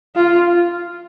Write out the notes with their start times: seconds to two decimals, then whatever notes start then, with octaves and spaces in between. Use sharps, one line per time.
0.16 F4